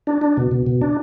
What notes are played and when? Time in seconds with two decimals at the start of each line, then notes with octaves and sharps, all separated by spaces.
0.07 D4
0.21 D4
0.37 B2
0.51 B2
0.66 B2
0.81 D4